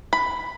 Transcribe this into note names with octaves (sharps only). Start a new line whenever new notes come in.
B5